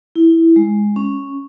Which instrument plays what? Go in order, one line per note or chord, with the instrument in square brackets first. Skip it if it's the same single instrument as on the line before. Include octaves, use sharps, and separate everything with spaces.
[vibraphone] E4
G#3
C#4